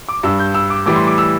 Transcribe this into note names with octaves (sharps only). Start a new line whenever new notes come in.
D6
G2 G3 E6
G6
E6
D6
A2 E3 G3 D6
C6
D6
E6